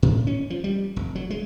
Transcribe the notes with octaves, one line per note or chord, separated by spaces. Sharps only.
A2
C#4
F3
G3
F1
F#3
G#3